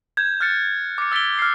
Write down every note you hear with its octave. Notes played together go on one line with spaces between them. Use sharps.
G6 G#6
F6 F#6 A6 C#7
D6 C#7
E6 A6 B6 D7 G7
F6 C7